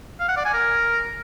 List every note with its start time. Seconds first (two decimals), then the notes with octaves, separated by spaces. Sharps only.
0.20 F5
0.28 F#5
0.37 D5
0.45 G#5
0.54 A#4